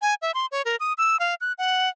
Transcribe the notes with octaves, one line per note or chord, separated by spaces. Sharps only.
G#5
E5
C6
C#5
A#4
D#6
E6
F5
F#6
F#5